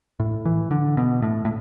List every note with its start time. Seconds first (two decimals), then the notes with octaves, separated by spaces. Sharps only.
0.20 A2
0.45 E3
0.71 D3
0.97 B2
1.22 A2
1.45 A2